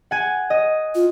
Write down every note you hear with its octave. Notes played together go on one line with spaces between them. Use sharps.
F#5 G#5
D#5
F4